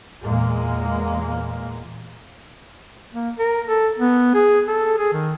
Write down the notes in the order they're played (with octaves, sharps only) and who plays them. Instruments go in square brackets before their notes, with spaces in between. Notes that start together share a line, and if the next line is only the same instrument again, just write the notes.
[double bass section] E2 A#2 G#3 A#3
[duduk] A#3
A#4
A4
B3
G#4
A4
G#4
D#3